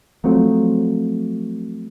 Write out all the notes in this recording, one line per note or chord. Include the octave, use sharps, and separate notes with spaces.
F3 F#3 A3 C4